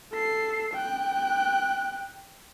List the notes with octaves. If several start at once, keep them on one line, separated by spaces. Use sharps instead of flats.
A4 C7
G5 F#6